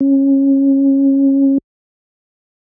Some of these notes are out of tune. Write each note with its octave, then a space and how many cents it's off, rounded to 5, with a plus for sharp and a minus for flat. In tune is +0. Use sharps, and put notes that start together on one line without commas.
C#4 -20